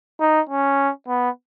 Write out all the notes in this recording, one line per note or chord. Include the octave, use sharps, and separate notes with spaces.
D#4
C#4
B3